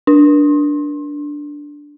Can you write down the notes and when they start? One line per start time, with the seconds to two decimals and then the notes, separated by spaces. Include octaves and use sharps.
0.07 D4